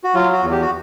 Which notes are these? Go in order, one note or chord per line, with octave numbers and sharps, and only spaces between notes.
F#4
F#3 F4
F#4
E2
G4
F#4